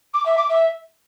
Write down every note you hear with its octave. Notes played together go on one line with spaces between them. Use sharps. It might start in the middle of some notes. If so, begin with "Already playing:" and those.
D6
E5
D6
E5